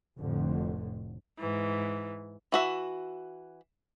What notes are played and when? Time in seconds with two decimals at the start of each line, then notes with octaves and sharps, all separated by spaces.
0.18 F1 F2 A2 D3
1.38 G#2 E3
2.52 E3 F#4 E5